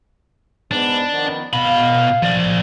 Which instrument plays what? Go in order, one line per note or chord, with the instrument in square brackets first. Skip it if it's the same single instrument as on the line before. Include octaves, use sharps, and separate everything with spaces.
[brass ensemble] G#2 B3 [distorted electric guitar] D4
[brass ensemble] D#3 F3 B3
[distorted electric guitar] B2 B5 [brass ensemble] F5
[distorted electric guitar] F3 D5